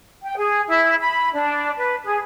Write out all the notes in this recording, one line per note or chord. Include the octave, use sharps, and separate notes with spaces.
G5
G#4
E4
B5
D4
B4
G#4